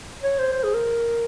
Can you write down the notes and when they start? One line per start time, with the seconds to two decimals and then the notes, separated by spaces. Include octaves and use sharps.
0.23 C#5
0.39 C5
0.53 C5
0.63 G#4
0.74 A#4